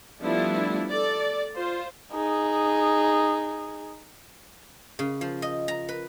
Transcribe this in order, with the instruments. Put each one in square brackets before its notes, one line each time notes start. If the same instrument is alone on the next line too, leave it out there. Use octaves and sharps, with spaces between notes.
[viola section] F3 G3 A3 B3 D4 E4
A4 D5
F4 C5
[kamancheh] D#4 G#4
[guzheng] C#3
F3
D#5
A#5
B4